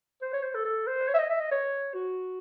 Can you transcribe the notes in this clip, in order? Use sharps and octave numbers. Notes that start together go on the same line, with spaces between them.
C5
C#5
C5
A4
A4
C5
C#5
E5
D#5
E5
D#5
C#5
F#4